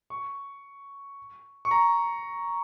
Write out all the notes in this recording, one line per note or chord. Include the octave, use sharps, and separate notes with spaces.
C#6
C#6
A#5